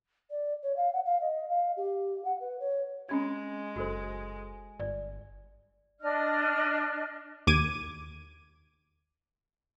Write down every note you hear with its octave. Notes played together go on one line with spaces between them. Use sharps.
D5
C#5
F5
F#5
F5
D#5
F5
G4
F#5
B4
C#5
G#3 C4 C#4 G#6
F#1 F#4 A4 C5
G1 D5
D4 D#5 F6
D#2 D6 G#6 D#7